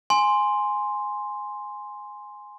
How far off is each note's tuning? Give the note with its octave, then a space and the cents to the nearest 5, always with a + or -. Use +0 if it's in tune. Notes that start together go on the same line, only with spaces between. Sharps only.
G#5 +0 C6 +0